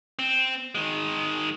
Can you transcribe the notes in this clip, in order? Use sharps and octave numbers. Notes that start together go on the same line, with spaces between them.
C4
D#3 G#3